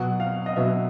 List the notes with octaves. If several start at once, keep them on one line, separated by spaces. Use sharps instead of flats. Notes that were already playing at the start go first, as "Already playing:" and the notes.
Already playing: B2 F#3 F#5
F5
D#5
B2 F#3 E5